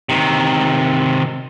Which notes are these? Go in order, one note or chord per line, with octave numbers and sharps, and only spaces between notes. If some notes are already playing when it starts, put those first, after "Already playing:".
C3 D#3